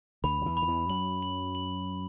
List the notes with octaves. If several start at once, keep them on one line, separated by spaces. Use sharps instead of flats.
D2 D3 B5
F#3
E2 E3
B5
D3
E2 E3
F#2 F#3 F#7
F#7
F#7